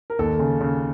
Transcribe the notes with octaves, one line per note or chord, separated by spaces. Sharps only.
A#4
D#2 A4
C#3
C#3